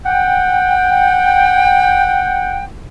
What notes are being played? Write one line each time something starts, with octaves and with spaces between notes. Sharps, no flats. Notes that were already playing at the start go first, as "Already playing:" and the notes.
F#5 G5